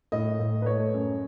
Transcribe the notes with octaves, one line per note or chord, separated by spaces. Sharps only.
A2 D#5
A2
B4
A3 C#5
F#2